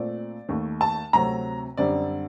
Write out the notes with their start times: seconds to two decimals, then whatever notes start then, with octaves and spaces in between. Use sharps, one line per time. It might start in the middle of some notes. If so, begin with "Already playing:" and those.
Already playing: A#2 A3 C4 D5
0.49 D#2 D#3 A3
0.81 A5
1.13 D2 C3 F#3 A3 C4 A#5
1.77 F#2 D3 G3 C4 D5